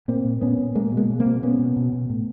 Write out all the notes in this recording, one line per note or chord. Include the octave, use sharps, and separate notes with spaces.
A#2 A#3 C4
A#2
A#2 B3 C#4
A#2
B2 G#3 A#3
B2
G#3 A#3
B2
A#3 C4
B2
B2 B3 C#4
B2
B2
B2
A2